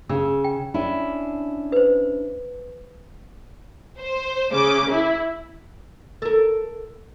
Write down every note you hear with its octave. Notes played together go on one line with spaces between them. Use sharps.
C#3 E6
G5
C#4 D4 E4
B4 C5
C5
C#3 D6
E4
A4 A#4